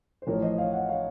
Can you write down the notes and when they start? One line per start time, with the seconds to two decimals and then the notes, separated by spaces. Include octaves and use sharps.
0.22 C5
0.27 A1 A2 F3 A#4 C#5
0.42 C5 D#5
0.58 C#5 F5
0.72 D#5 F#5
0.89 C#5 F5